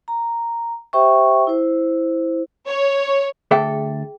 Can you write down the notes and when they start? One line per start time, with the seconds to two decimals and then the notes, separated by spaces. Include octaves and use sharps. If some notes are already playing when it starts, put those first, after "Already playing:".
0.08 A#5
0.93 G4 C5 E5 G5 C#6
1.47 E4 C5
2.68 C#5
3.51 D2 G#4 A4 E5 G5